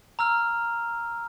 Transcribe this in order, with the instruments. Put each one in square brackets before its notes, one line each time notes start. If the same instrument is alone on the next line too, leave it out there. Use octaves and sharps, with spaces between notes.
[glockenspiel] A#5 E6 F6